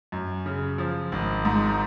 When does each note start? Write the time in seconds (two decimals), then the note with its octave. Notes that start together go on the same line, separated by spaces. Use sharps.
0.12 F#2
0.46 C#3
0.78 F3
1.12 G#1
1.45 G#2